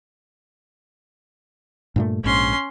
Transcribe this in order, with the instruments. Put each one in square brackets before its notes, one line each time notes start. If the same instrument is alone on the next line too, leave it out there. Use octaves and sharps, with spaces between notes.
[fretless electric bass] G2 A#2 A3
[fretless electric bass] A#1 G#2 [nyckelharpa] C#4 C6